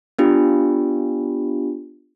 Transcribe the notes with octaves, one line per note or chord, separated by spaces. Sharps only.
B3 D4 F4 G4